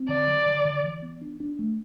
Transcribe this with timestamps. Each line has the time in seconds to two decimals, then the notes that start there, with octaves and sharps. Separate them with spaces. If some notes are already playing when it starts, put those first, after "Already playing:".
Already playing: C4
0.09 D3 D5
0.27 F#3
0.46 D3
0.65 D3
0.84 E3
1.02 B3
1.21 D4
1.40 D4
1.59 A3